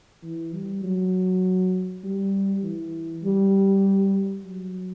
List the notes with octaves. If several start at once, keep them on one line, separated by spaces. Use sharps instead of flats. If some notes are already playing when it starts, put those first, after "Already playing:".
E3
G3
F#3
G3
E3
G3
F#3